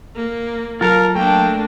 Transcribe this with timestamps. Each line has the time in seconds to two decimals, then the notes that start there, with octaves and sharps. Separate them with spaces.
0.15 A#3
0.81 F#3 F4 A4 A#4 F5
1.15 A3 A#3 D4 G5